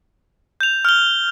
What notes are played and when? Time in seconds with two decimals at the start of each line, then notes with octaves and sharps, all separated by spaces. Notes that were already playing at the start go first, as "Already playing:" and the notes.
0.61 G6 F7
0.85 F6 G7